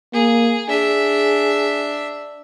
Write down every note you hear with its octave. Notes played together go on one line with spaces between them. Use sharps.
A#3 G#4
D4 G#4 E5